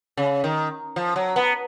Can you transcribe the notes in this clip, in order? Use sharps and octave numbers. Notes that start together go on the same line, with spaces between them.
C#3
D#3
F3
F#3
B3